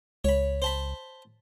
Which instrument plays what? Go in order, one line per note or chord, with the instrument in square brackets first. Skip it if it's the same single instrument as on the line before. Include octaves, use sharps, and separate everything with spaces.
[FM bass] C#2 [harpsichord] C#5 B5
[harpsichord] C5 A5 B5